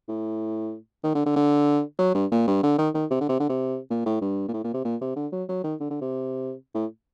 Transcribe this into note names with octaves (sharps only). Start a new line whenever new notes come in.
A2
D#3
D3
D3
D3
F#3
G2
A#2
G2
D3
D#3
D#3
C3
D3
C3
D3
C3
A#2
A2
G2
A#2
A2
A#2
C3
A#2
C3
D3
F#3
F#3
D#3
D3
D3
C3
A2